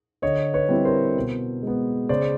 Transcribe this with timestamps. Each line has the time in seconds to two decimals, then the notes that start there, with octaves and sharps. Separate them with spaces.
0.22 D3 C#5 D#5
0.54 B4 C#5
0.69 G3 C4 E4
0.85 A#4 C5
1.17 B2
1.63 G#3 B3
2.09 C#3 C5 D5